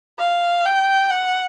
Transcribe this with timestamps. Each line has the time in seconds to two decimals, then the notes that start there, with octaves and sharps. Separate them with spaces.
0.19 F5
0.65 G5
1.11 F#5